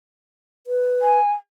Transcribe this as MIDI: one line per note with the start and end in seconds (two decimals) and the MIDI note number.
0.67 1.19 71
1.01 1.32 80